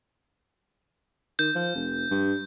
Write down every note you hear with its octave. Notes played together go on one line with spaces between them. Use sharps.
D#3 G6
F3
F1
G2